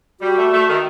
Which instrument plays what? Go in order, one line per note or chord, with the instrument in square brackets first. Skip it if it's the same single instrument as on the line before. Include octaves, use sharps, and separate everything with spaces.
[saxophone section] G3 [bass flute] F#4
[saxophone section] A3
A3
D#3